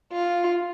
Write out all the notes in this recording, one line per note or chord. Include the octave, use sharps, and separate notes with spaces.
F4